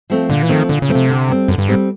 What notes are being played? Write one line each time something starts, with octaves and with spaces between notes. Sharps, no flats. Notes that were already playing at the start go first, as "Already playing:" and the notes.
F3 A3 C4
A#2 D3
E3
D#3 F3 A3 C4
A#2 D3
C#3
F3 A3 C4
C3
D3
G3 C4
F#2 D3
G2
G#2 G3 C4